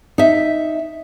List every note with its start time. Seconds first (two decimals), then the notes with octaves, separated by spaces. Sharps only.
0.18 D#4 E5